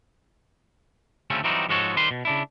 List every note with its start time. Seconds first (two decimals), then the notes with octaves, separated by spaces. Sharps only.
1.30 D2 C#3 A3 C4 C#4
1.44 E3 F#3 G3 C4 D#4 F#4
1.69 G#2 F3 G#3 F#4 A4 C#5
1.97 D#3 G3 B4 C5 C6
2.11 B2
2.25 C#3 D4 E4